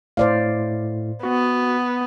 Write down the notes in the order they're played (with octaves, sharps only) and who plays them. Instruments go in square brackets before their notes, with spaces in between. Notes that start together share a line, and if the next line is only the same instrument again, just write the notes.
[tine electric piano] A2 [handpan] C5 D5 F5
[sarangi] B3 [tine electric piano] F#4